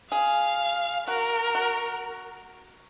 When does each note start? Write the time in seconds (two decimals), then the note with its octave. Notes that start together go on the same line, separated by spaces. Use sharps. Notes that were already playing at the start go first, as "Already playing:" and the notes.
0.11 G#4 F5
1.07 F#4 A#4
1.55 F#4